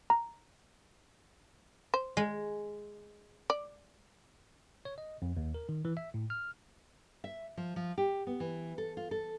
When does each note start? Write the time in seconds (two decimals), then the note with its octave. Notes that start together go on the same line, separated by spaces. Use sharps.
0.10 A#5
1.94 C5
2.17 G#3
3.50 D5
4.85 C#5
4.98 D#5
5.22 F2
5.37 D#2
5.54 A#4
5.69 D#3
5.85 E3
5.97 E5
6.14 A2
6.30 F6
7.24 E5
7.57 F3
7.76 F3
7.98 G4
8.27 B3
8.40 E3
8.78 A4
8.97 F4
9.11 A4